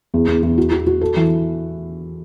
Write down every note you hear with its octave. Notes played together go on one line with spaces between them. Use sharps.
E2
E2
E2
F#4
F#4
F#4
A4
E3